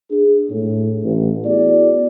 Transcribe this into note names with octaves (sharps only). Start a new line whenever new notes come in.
D4 G#4
A2
A1
B3 E4 F#4 G#4 D5